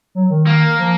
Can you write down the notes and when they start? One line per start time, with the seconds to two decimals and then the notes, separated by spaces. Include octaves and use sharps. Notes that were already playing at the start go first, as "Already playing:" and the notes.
0.15 F#3
0.30 D#3
0.47 A#3
0.79 F3